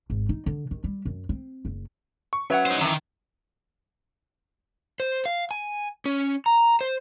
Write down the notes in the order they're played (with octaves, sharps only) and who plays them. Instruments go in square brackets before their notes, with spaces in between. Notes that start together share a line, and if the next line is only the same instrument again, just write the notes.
[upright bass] G#1
D#4
D3
D#3
G3
F#2
C4
F#1
[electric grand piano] C#6
[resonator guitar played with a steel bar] F#3 C#5 F#5 [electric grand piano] C#4 B4 E5
[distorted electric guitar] D#4 C5
[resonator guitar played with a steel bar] F#2 E3 [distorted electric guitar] D#3
[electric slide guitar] C5
F5
G#5
C#4
A#5
C5